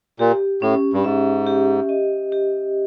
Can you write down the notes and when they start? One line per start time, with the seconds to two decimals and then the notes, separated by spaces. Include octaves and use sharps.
0.19 A#2 G4
0.62 A2 C#4
0.93 G2
1.04 G#2 E5
1.47 G4
1.89 D#5
2.32 G4